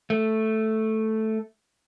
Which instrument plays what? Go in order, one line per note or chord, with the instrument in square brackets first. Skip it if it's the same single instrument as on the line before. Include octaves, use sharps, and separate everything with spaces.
[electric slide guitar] A3